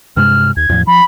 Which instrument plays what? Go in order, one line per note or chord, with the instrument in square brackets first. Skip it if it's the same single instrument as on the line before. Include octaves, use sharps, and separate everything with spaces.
[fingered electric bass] G2 C3 G#3 [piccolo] F6
[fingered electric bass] D#2 [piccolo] G#6
[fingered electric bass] E2 A2 F3
[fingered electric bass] F3 [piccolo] B5